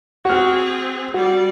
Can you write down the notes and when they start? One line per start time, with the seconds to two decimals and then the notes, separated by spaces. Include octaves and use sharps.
0.25 C4 F#4 G#4 F6
1.14 G3 F#4 D5